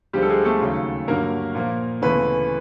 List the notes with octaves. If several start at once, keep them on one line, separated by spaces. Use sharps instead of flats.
D2 D3 F3 G3 G#3 G4
A4
G#3 G#4
A3 A4
D#2 C#3 F#3 A3
G2 D3 F#3 A#3 A#4
A#2 F3 A#3
D2 C#3 E3 A3 B3 B4